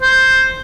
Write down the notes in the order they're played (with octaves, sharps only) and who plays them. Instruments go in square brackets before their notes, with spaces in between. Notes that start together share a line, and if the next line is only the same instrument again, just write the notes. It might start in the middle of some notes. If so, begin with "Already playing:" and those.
[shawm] C5